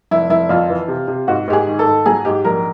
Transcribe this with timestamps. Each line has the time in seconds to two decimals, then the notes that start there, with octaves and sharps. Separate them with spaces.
0.11 F1 E4
0.30 F1 E4
0.49 F2 F4
0.69 E3
0.88 C3
1.08 C3
1.28 G#2 F#4
1.48 G#2 G4
1.53 G#4
1.67 D#3
1.79 A4
1.86 G#2
2.06 F#3 G#4
2.25 G#2 G4
2.44 A#1 A#4